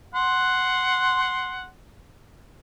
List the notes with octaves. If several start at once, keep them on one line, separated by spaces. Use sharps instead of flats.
F#5 C6